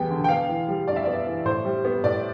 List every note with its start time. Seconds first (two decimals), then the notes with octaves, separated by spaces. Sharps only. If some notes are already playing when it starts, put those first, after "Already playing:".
Already playing: E2 G3 B3 G5
0.10 D3
0.24 G5
0.29 B3 F5
0.49 E3
0.68 G3
0.88 G2 D5
0.96 E5
1.04 B3 D5
1.26 E3
1.45 A2 C5
1.65 G3
1.85 B3
2.04 A2 D5